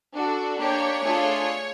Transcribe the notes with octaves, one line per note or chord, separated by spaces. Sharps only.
D4 F#4 A4
A#3 D4 G4 C#5
A3 D4 F4 G#4